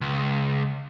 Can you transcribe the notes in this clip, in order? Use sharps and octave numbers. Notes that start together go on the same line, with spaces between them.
C#2